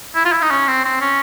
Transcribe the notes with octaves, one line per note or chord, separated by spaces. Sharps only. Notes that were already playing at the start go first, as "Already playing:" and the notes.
E4
F4
E4
D#4
C#4
C4
C4
C#4